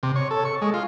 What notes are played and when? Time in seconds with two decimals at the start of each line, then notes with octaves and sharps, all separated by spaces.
0.03 C3
0.16 C#5
0.31 A4
0.45 C#6
0.62 G#3
0.74 F4